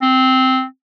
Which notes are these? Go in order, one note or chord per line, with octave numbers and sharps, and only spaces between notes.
C4